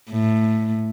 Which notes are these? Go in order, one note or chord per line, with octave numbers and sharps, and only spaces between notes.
A2